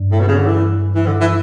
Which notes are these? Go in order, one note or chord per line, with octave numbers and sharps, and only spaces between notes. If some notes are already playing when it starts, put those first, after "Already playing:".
Already playing: G2 F#3 B3 D4
A2
B2
C#3
D3
E3
E3
D3
E3